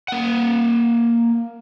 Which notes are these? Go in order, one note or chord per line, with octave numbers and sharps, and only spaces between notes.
A#3 F#5